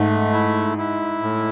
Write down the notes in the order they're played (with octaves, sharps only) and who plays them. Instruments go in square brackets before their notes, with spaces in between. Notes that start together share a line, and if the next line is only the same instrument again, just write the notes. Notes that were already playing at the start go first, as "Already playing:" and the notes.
Already playing: [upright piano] G#2 [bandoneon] A3
[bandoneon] E4
E4
A2